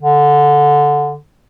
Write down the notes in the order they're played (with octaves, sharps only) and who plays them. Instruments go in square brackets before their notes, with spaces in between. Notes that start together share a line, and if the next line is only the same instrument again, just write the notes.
[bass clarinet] D3